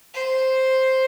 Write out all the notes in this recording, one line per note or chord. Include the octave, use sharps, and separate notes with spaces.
C5